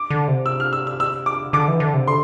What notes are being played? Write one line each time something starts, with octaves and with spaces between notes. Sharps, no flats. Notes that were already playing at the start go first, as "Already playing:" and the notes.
Already playing: D6
D3
C3
E6
F6
E6
E6
E6
D6
D3 D6
E3
D3
C3
D3 C6